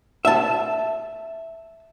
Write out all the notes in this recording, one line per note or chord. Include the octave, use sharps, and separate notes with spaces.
E5 A5